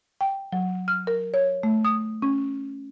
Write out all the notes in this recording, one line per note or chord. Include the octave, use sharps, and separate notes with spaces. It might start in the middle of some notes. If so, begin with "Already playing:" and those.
G5
F#3
F6
A#4
C#5
A3
D#6
C#4